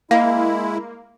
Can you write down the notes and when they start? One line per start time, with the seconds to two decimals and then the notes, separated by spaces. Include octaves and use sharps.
0.11 G#3 A#3 E4 F5